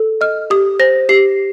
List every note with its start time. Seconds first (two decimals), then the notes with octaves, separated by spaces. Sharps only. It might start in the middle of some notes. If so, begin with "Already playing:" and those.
Already playing: A4
0.21 D#5 F6
0.50 G4 D#6
0.79 C5 A#6
1.09 G4 C7